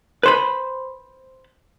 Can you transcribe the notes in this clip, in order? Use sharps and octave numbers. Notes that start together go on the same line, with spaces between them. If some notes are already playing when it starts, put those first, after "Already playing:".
B4 C5 B5